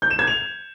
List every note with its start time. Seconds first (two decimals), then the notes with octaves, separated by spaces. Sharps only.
0.02 G6
0.10 E7
0.19 G#6
0.27 F7